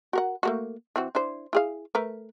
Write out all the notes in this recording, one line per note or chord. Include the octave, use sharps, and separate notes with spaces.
F#4 A#4 F#5
A3 A#3 F#4
E3 C4 F#4
D4 E4 C5
E4 G#4 F5
A3 A#4 B4